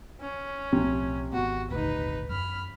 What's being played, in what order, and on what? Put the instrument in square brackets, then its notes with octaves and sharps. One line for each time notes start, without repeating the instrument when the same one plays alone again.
[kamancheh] C#4
[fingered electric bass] B1 A2 F3 [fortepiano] C3
[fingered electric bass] G#1 B3 [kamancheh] F#4
[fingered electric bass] D#1 G#1 D2 [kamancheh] D#4 B4
[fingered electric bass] F#2 [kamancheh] B5 F6